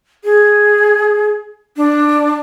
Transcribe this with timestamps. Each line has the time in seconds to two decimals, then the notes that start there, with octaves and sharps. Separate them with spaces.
0.24 G#4
1.77 D4